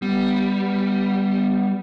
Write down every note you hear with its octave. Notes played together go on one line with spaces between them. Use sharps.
G3 B3